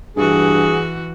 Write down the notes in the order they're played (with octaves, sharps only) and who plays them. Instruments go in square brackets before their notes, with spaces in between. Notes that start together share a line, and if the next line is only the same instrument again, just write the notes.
[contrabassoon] G2 [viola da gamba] E3 F#4 [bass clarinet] G#4